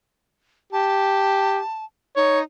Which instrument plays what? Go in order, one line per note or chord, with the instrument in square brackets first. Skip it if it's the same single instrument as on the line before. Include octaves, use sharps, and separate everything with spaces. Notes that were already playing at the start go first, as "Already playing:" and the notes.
[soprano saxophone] G4 [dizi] A5
[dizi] D#4 [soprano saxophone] C#5